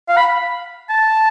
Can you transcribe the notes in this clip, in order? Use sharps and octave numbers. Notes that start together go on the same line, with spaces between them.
F5
B5
A5